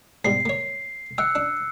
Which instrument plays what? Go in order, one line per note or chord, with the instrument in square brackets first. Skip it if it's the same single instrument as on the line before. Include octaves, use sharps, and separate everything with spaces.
[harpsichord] G#2 B2 G3 [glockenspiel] C7
[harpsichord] A#3 C#5
[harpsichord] E5 G5 [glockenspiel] E6 F#6 C#7
[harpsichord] D4